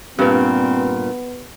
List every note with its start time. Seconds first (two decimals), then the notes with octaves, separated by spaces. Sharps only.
0.19 G2 A#2 B3 C4 G4 A#4 B4